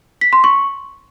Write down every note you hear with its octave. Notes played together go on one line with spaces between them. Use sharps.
B6
C6
C#6